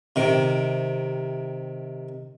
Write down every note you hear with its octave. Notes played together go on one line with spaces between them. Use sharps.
C3 D#3